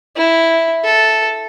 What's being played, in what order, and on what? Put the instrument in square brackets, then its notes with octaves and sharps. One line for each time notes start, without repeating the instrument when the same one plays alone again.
[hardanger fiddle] E4
A4